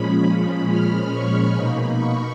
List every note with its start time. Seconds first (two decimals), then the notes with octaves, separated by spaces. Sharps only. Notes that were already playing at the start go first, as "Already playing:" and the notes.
Already playing: A#2 F3 G#3 C#4 B5
0.30 B5
0.71 F6
1.14 C#6
1.55 B2 A#3 D#4 B5
1.98 C#6